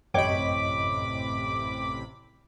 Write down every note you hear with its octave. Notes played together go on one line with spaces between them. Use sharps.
A1 F#2 C3 C#5 D#5 G5 B5 D6